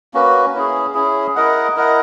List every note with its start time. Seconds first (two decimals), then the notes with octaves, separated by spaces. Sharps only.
0.14 A#3 C#4 F#4 B4
0.54 C#4 E4 G#4
0.94 C#4 E4 G#4
1.35 E4 A#4 D#5 F#5
1.76 E4 A#4 D#5 F#5